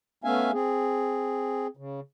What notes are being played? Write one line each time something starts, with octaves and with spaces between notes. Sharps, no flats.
A3 B3 C#4 E5 F5 G#5
C4 G#4
C#3